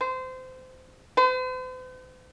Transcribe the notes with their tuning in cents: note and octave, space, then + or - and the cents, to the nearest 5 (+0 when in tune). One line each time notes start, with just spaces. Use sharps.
C5 -25
C5 -45